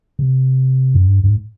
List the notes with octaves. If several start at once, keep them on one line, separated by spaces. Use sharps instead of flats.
C3
F#2
G2
G2
G#2